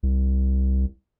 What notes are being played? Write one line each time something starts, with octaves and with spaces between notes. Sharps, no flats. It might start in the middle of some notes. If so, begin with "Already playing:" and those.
C2